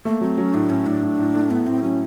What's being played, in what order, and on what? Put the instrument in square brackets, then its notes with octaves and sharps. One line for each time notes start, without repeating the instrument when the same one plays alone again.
[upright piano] A3 [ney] A#3
[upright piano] F#3 [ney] C4
[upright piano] F#3 [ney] C#4
[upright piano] A2 [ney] D4
[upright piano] A2 [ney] C#4
[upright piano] A2 [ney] D4
[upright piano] A2
A2
A3
[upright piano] A2 [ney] B3
[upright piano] A2 [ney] C4
[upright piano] F#3 [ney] C#4